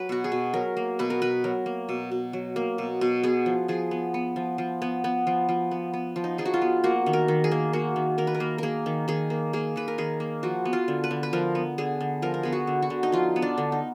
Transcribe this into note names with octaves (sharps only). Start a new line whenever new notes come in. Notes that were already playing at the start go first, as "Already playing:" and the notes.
Already playing: F#3 B4
B2 F#4
G#4
B2
F#3 A#4
A#3
B2 B4
A#4
B2 B4
F#3 A#4
A#3
B2
B2
F#3
A#3
B2
B2
B3 G#4
F3
F3 G#4
B3
B3
F3
F3
B3
B3
F3
F3
B3
B3
F3
D#4
F3 G#4
F#4
F4
B3
A#3 F#4
D#3
A#4
D#3
G#4
A#3
A#3 F#4
D#3
D#3 A#4
B4
A#4
A#3
A#3 G#4 A#4
D#3
D#3 G#4
A#3
A#3 G#4
D#3 B4
A#4
D#3 G#4
A#3
F3 F#4
B3
F4
D3
B4
D3
B4
F3 A#4
B3
D3 G#4
D3
F3 A#4
A#4
B3 G#4
F#4
D3
F#4
D3
D#4
F3 F4
B3
D4
D3
D#4